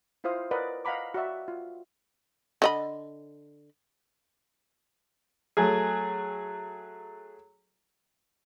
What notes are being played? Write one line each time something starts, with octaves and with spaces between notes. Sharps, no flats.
E4 F4 C5 F5 D#6
A#4 B4 D5 D#5 F#5
D#5 F5 F#5 A#5 B5 D6
F#4 D5 E5
F4
D3 D#5 B5
F#3 A3 G#4